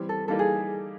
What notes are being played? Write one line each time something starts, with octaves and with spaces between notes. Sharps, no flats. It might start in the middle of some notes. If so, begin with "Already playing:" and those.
Already playing: E3 G3 C4
A4
E3 G3 A#3 D#4 A4
G#4